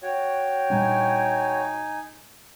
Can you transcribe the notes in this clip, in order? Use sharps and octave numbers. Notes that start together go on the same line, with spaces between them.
F#4 C#5 G5
A#2 G3 D4 D#4 G#5